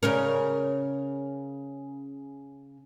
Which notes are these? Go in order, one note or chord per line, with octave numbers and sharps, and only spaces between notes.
C#3 C#4 A#4